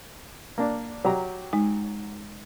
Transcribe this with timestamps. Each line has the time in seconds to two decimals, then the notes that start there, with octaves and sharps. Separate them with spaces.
0.58 A#3 D4
1.05 F#3 G4 A#5
1.53 G#3 D#4